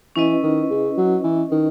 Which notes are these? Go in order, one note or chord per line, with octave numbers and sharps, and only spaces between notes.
E3 C#4 E4 B4 D#5
D#3
C#3
F#3
E3
D#3